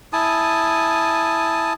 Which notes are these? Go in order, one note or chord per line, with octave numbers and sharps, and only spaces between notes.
E4 G#5 A5 D#6